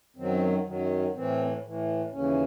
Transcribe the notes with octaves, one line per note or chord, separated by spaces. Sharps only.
F#2 D#3 F#3 C4
F#2 D#3 F#3
A2 E3 C4
A2 E3
D#2 C#3 E3 C#4